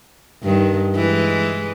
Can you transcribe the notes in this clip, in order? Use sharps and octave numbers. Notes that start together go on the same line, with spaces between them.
G2 D#3
E3 G#3